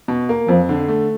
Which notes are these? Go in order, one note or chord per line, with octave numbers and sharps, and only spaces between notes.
B2
A#3
F2 F3
D3
A3